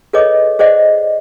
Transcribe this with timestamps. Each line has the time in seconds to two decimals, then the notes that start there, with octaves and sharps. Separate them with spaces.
0.13 G#4 A4 B4 C#5 D#5 D6
0.59 G#4 C5 D5 D#5 F#5